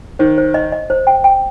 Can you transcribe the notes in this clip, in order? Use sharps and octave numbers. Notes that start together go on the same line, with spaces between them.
D#3 C5
C5
D#5
D#5
C5
G5
G5